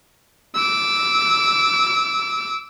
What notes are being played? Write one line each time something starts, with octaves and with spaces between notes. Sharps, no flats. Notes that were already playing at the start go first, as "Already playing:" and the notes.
D6 E6